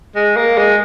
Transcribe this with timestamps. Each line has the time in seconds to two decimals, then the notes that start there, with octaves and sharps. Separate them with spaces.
0.15 G#3
0.37 A#3
0.58 G#3